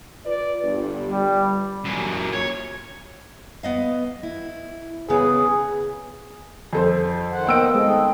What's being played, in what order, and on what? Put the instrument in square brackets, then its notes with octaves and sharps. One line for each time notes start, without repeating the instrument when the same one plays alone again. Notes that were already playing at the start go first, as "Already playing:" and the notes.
[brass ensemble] F4 B4 D5
G1 G2
[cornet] G3
[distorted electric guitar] F#2 A#2
C#5
[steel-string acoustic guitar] B3 D#5 F5
E4
[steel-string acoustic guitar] C#3 B3 [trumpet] G#4
[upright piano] F2 A4 C5
[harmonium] D#3 C5 F#5
[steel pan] A#3 B3 D#5 [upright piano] G5 E6 D7
[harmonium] G#2 C4 A4 [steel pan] G#3 G#4